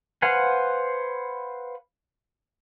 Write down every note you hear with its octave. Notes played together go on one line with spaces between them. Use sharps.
B4 C5 F5 F#5 G#5